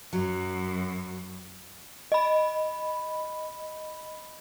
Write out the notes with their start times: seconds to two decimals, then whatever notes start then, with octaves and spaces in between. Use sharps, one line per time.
0.13 F#2 F#3
2.12 D#5 B5